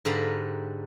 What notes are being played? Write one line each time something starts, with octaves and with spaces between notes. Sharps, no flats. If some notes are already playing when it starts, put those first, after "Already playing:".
G#2 D3 G4 B4 F5 A#5